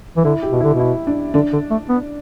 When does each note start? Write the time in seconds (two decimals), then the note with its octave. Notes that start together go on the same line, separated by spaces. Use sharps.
0.17 E3
0.24 D3 E4
0.43 G4
0.52 B2
0.60 D3 E4
0.74 B2
0.79 E4
1.07 D4
1.34 D3 D4
1.53 D3
1.71 A3
1.89 B3